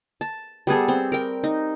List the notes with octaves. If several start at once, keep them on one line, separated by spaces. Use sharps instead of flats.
A5
G3 B3 G#4 A4
C4
A#4 G5
D#4